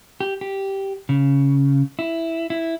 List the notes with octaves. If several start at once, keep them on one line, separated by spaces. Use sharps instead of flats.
G4
G4
C#3
E4
E4